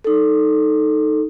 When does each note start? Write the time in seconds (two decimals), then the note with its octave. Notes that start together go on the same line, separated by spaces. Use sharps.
0.04 D#4 A4